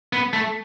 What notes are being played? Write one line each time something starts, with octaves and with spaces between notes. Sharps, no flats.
B3
A3